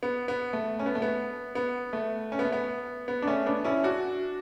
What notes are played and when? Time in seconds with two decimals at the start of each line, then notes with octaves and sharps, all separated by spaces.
0.03 B3
0.28 B3
0.53 A3
0.79 C#4
0.86 B3
0.95 A3
1.02 B3
1.55 B3
1.93 A3
2.32 C#4
2.39 B3
2.45 A3
2.52 B3
3.08 B3
3.22 D4
3.27 A3 C#4
3.46 B3 D4
3.64 C#4 E4
3.84 D4 F#4